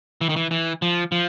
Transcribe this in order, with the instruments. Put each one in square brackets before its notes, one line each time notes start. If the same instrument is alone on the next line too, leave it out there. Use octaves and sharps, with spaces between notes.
[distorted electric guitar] E3
D#3
E3
E3
F3
F3